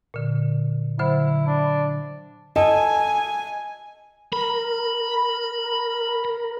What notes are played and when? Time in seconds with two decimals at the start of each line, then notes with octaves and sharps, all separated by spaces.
0.14 A#2 D3
0.99 D3 F#3 E4 C5
1.47 D4
2.56 A4 D#5 G#5
4.32 A#4 B5